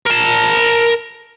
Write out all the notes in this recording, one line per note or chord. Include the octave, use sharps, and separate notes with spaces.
A#4 A5